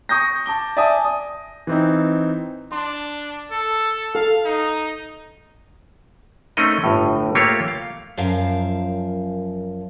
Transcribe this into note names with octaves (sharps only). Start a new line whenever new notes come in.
C#6 D#6 G6 A#6
A5 D6 G7
D5 E5 G#5 A5 D#6
D#6
E3 C4 D#4
D4 C6
A4
A4 F5 A5
D#4
A3 C4 C#4 D#4 A#4 D#5
G1 A2
A3 A#3 F4 G4 C#5
F5
F#2 F3 A#4 F5 A5